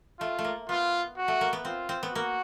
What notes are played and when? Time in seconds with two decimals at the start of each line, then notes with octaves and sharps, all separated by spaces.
0.20 A3 F4
0.39 A3
0.44 A#3
0.69 B3 F4
1.17 F#4
1.28 A3
1.41 A#3
1.53 B3
1.65 C4 F4
1.89 C4
2.03 B3
2.13 A#3 F#4